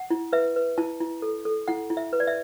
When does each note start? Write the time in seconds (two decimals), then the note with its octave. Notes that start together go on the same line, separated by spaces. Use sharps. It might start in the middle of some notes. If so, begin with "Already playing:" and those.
Already playing: F#5
0.10 E4
0.33 B4 E5
0.56 B4
0.78 E4 A5
1.00 E4
1.22 A4
1.45 A4
1.68 E4 F#5
1.90 E4
1.97 E5
2.13 B4
2.20 D5
2.27 E5